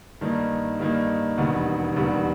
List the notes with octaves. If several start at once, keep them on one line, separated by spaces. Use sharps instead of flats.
G2 D#3 G3 A#3 D#4
G2 D#3 G3 A#3 D#4
E1 D#2 D#3 G3 B3
E1 D#2 D#3 G3 B3